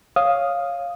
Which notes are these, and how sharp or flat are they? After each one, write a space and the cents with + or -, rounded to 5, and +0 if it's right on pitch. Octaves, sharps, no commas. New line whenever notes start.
C#5 +0 F5 +0 D#6 +0